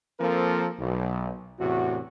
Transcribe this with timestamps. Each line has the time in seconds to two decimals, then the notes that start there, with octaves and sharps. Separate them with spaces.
0.20 F3 A#3 C4 A4 A#4
0.78 B1
1.59 E2 A2 C3 F#4